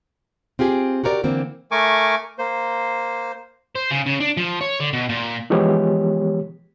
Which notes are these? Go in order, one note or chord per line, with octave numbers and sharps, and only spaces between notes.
C4 F4 G4 G#4
F#4 G4 A#4 C#5 D5
D3 E3 A#3 C4
A3 A#4 G#5 C#6 D6
A#3 C5
C5
C#3
C#3
D4
F3
C#5
D3
B2
A#2
E3 F3 G#3 B3 G4 C#5